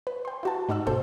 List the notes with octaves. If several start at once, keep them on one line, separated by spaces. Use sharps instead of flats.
B4
G5 C6
E4 F#4 A5
G#2 D#4 F#4 D5 E6 F#6
G1 B2 A4 C5 G5 G6